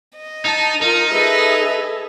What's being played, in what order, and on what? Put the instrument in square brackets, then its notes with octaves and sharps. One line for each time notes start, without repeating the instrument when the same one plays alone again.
[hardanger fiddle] D#5
[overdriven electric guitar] D#4 [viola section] A5
[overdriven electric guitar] D#4 [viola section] F4 A#4
[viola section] G#4 A4 E5 [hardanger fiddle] B4 D#5